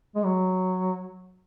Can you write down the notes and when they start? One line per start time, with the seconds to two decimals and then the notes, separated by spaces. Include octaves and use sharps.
0.15 G#3
0.24 F#3